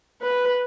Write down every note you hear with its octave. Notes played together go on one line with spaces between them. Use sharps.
B4